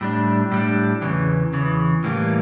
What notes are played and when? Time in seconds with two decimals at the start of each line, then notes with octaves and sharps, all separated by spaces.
0.01 A2 G3 D4
0.52 A2 G3 D4
1.02 E2 C#3 E3
1.53 E2 C#3 E3
2.04 A2 E3 G3 A#3